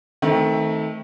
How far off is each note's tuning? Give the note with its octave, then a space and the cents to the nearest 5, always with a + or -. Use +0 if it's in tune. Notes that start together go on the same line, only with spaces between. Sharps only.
D#3 +25 A3 +0 C4 +0